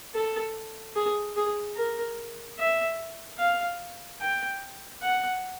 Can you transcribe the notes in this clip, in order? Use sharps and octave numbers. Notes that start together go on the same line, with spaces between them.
A4
G#4
G#4
A#4
E5
F5
G5
F#5